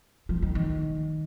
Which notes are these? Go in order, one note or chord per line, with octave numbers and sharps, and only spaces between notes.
F3
D#3
D#3